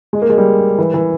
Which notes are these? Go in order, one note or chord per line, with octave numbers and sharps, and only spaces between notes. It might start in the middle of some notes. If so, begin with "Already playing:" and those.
G#3
A#3
G#3
G3
E3
E3